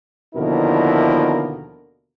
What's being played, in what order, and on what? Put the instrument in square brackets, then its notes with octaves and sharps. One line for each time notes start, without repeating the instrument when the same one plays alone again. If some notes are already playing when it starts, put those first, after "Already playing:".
[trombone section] D#2 B2 D3 F3 E4 A#4